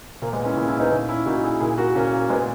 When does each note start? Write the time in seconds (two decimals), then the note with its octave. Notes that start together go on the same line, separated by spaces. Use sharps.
0.22 A#2 A#3
0.33 G#3 B3
0.45 C#4 E4
0.56 A#2 E4 G#4
0.68 C#4 E4
0.80 B3 D#4
0.91 A#2 C#4 E4
1.09 C#4 E4
1.26 A#2 D#4 F#4
1.43 E4 G#4
1.60 A#2 E4 G#4
1.78 F#4 A#4
1.95 A#2 A#3 C#4
2.13 A#3
2.30 A#2 G#3 B3